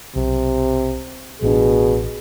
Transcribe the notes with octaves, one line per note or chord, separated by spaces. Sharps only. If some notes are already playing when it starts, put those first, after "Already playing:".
B1 C3
A1 B2 D4 G#4